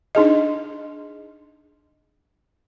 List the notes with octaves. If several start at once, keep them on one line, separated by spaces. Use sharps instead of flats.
D4 D#4 G#4 D#5